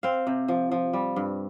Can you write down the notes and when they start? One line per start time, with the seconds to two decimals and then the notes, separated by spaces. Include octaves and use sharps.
0.03 C4 F5
0.27 C3
0.48 F3
0.72 F3
0.93 G3
1.16 G2